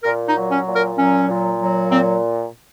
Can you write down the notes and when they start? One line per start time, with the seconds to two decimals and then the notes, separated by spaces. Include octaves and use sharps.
0.03 A#2 A#4
0.28 D#4
0.35 F#3
0.51 C#4
0.67 A#2
0.75 A#4
0.98 F#3 C#4
1.29 A#2
1.59 F#3
1.90 A#2 C4